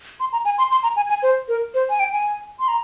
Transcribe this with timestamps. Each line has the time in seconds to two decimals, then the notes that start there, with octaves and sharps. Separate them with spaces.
0.20 C6
0.32 A#5
0.45 G#5
0.58 C6
0.71 C6
0.83 A#5
0.96 G#5
1.09 G#5
1.23 C5
1.48 A#4
1.74 C5
1.90 G#5
2.00 G5
2.13 G#5
2.59 C6
2.68 A#5